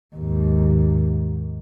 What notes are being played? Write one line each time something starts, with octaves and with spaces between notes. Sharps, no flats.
D#2 G#2